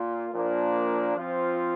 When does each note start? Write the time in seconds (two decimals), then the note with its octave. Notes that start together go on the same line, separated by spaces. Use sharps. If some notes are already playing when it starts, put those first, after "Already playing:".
Already playing: A#2 A#3 F4
0.34 A#2 F3 A#3 D4
1.16 F3 C4 F4